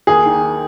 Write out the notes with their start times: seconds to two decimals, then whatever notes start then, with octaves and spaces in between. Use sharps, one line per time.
0.07 D#2 G#4
0.26 D#3